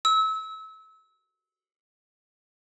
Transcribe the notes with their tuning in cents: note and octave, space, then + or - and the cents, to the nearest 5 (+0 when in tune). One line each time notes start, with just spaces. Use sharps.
E6 -30